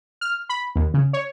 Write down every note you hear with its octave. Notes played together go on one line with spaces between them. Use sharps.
F6
B5
D#2
C#3
C#5